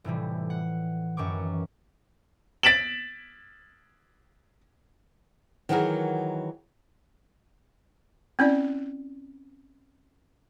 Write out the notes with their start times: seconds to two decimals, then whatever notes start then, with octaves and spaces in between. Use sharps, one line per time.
0.04 F1 A2 E3 G3
0.50 F#5
1.17 F#2 D#3 E3 C#6 D6
2.63 A6 B6 D7 E7 F#7
5.69 D#3 E3 F#3 F#4 G#4 A#4
8.39 C4 C#4 E4 D5